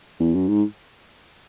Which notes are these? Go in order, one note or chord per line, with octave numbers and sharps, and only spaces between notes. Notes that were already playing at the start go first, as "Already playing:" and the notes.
E2
F#2
G#2